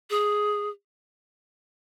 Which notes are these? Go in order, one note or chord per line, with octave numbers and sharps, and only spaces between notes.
G#4